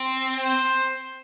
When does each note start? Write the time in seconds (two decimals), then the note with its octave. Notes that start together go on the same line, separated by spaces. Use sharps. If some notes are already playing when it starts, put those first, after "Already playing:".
Already playing: C4
0.40 C5